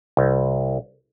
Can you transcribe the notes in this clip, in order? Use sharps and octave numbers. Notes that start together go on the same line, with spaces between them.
C2